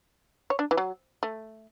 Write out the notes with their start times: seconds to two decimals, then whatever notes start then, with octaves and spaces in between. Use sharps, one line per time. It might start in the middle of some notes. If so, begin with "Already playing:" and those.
0.50 C#5
0.59 D4
0.71 E3
0.77 F#3
1.23 A3